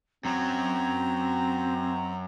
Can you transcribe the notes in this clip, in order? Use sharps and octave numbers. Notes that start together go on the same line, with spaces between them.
F#2 F#3 C4 A#5